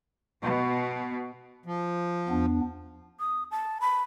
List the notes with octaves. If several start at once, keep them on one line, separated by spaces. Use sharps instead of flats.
B2
F3
E2 B3 D4
D#6
A5
B5